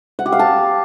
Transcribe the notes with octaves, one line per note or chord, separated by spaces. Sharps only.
F#5
G4
F5
A5